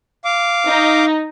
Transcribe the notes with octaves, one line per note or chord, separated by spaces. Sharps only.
F5 D6
D#4